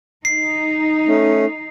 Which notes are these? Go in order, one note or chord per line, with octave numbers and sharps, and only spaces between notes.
D#4 C7
A3 C#4